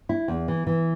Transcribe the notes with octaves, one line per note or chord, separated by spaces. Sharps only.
E4
E2
E3
E3